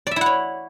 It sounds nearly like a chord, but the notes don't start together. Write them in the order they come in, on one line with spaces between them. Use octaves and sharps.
D5 E5 E4 F#5 C#5